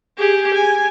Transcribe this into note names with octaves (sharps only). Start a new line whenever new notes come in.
G4 G#4
G#5